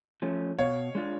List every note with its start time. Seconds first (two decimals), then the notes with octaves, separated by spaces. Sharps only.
0.22 F3 A3 C#4
0.59 B2 C#5 F5
0.95 G#3 D4 F4